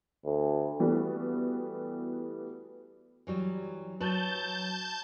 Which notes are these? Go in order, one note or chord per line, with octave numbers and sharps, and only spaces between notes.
D2
E3 G3 A3 B3 F#4 B4
E3 F#3 G3
F#3 B4 A5 G6